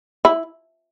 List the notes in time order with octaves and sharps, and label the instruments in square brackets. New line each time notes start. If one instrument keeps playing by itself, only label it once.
[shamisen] E4